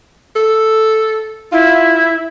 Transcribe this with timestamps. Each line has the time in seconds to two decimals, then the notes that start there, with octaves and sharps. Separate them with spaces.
0.36 A4
1.52 E4 F4